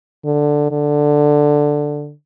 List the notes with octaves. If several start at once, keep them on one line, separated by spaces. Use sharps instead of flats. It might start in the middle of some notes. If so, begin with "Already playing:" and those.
D3
D3